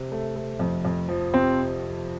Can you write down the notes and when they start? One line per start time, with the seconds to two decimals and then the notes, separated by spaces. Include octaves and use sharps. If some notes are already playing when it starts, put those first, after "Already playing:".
Already playing: C3
0.12 A3
0.36 A3
0.60 F2
0.85 F2
1.09 F3
1.34 C3 C4